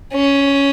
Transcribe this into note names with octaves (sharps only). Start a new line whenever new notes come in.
C#4